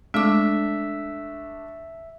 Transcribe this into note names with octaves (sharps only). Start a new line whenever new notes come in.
G#3 A3 D4 E5 D6